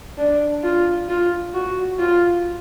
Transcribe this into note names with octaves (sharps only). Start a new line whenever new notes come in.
D4
F4
F4
F#4
F4